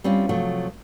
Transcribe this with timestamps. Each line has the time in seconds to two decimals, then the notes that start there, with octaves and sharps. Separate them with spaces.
0.04 G3 C4 C#4 E4 F4
0.29 C3 F3 F#3 A3